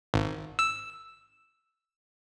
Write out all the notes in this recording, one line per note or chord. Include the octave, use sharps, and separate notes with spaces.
G#1
E6